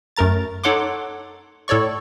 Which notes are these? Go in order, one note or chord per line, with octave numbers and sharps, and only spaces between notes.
F#2 A3 A#4 A#5 A6
D#4 A4 C#5 F#5 C6 D6
A2 A4 C#5 D5 C#6